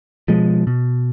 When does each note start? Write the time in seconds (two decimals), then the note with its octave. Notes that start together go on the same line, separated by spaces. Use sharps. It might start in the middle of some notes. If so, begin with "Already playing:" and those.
0.28 B2 F3 G#3
0.67 B2